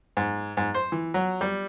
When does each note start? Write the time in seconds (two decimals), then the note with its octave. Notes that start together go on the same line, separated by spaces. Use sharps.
0.17 G#2
0.57 G#2
0.74 C5
0.92 E3
1.14 F#3
1.41 G3